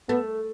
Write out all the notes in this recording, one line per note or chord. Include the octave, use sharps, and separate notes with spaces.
A3 B3